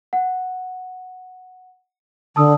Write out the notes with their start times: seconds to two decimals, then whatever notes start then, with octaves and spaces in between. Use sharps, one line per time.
0.13 F#5
2.36 D3 A5 D#6 E6